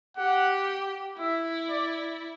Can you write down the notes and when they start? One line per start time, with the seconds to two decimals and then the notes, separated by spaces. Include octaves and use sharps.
0.17 G4 F#5
1.18 E4 E5
1.69 D5